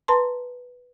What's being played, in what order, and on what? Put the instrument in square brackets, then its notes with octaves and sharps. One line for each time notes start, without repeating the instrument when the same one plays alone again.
[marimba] B4 A5 A#5 C6